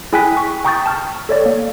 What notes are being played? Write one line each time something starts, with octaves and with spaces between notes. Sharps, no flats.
E4 G#4 G5 G#5 F#6 B6
C#6
G5 A#5 C#6 D#6 G6 A6
A5 F6
A4 C#5 D5
A#3